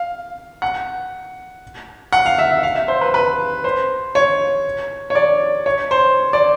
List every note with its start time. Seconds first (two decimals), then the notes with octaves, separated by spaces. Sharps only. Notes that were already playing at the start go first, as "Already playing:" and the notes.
Already playing: F5
0.62 F#5
2.13 F#5
2.26 F5
2.38 E5
2.63 F5
2.75 E5
2.88 C5
3.01 B4
3.14 B4
3.64 C5
4.15 C#5
5.10 C#5
5.15 D5
5.66 C#5
5.91 C5
6.33 D5